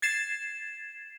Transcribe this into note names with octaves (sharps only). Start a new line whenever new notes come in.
G#6 A6 C7 E7